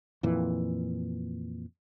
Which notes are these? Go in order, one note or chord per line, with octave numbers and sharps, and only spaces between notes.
F2 A#2 E3